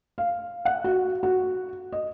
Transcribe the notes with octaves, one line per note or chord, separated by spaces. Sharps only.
F5
F#5
F#4
F#4
D#5